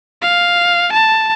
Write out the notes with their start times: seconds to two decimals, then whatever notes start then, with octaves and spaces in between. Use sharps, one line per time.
0.22 F5
0.93 A5